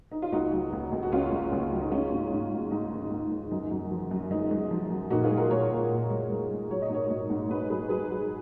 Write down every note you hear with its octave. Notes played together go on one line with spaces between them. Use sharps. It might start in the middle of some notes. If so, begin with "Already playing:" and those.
D#4
F4
C#2 D#4 F#4
F#3
C#2
C#2
F#4
C#2 C#4 F4
C#2
C#2
F#3
D#4
G#3 C#4 F4
G#2
G#2
G#2
G#2 D#4
D#3
G#2
G#3
F#2 D#4
F#2
F3
F#2
G#3 D#4
G#3
F3
F#2
A#2 D#4 F#4
F4 G#4
G#3
F#4 A#4
A#2 A#4 C#5
A#2
A#2
G#3
G#3
G#3
F#3 C#5
D#5
G#2 A#4 C#5
G#2
G#2
G#2 G#4 B4
F#3 G#4 B4
F#3 G#4 B4
F#3